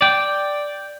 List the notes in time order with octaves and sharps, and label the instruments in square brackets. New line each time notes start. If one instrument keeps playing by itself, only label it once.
[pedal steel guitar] D5 G5